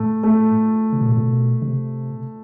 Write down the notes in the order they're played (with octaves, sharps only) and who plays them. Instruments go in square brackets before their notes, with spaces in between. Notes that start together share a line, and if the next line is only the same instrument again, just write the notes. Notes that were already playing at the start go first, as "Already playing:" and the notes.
Already playing: [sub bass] A2 [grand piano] A3
[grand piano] A3
[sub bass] C3
B2
A2
B2
C3